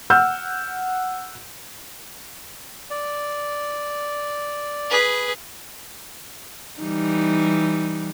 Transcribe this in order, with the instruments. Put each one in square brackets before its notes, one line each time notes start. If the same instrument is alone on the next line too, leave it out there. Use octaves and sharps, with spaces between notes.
[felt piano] F#5 E6 F6 G6
[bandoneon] D5
[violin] G#4 B4
[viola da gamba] E3 G3 D#4